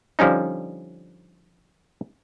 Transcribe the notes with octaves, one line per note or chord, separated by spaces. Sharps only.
D3 F3 G3 C#4 D#4